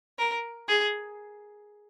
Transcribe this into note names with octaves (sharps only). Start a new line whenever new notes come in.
A#4
G#4